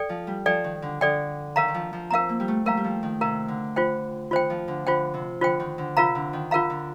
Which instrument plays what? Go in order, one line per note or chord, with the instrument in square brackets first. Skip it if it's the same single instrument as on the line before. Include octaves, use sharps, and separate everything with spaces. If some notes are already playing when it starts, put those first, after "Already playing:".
Already playing: [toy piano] A4 D5 G5
[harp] F3
G3
[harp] F3 [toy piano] A4 D5 G5
[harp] D#3
D3
[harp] D3 [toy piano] A4 D5 G5
[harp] D#3 [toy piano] A#4 F5 A#5
[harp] D#3
F3
F3
[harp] C4 [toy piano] A#4 F5 A#5
[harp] A#3
G3
A3
[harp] G3 [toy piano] A#4 F5 A#5
[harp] G3
F3
D#3
[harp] C3 [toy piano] A#4 F5 A#5
[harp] D3
[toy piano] F4 C5 G5
[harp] D#3 [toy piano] F4 C5 G5
[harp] F3
D3
[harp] D3 [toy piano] F4 C5 G5
[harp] C3
[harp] D3 [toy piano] F4 C5 G5
[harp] D#3
D3
[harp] C3 [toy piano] F4 A#4 F5 A#5
[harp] D3
D#3
[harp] D3 [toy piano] F4 A#4 F5 A#5
[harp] D3